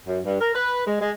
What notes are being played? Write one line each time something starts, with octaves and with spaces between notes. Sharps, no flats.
F#2
G2
A#4
B4
G#3
G#3